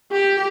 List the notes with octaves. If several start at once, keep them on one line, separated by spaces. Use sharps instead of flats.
G4